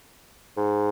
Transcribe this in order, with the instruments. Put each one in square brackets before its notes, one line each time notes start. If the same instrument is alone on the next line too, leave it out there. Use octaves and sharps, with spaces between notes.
[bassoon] G#2